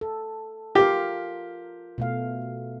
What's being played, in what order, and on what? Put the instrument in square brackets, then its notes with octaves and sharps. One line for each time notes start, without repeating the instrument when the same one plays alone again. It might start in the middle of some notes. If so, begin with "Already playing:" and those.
[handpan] A4
[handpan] F4 A#4 F5 [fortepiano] G4
[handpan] B2 A3 F5